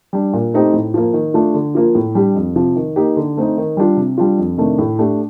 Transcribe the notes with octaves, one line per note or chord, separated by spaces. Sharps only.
G3 D4
A#2
A3 C4 D#4 G4
A2
F3 A#3
D#3
A3 D4 F4
D3
F3 A#3 F4
A2
G3 D4 G4
F2
C3 F3
D#3
A#3 D#4 G4
D3
A3 C4 D#4
D#3
G3 D4 F4
C3
G3 D4 F4
F2
C3 D#3 A3 D4
A2
A3 D4 G4